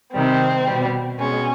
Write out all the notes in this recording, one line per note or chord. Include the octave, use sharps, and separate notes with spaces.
C3 D#3 G3 C4
G3
B2
B2 G#3 C#4